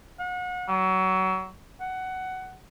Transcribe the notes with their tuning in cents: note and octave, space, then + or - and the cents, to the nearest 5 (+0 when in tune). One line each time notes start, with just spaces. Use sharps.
F#5 -35
F#3 +25
F#5 +15